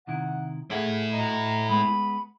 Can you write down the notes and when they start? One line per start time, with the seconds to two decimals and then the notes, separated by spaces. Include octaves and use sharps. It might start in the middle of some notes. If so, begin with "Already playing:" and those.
0.07 C3 D#3 E4 F#5
0.71 A3 E4 G#4 A4 F#5
1.13 F#4 D#5 A#5
1.69 G#3 B3 B5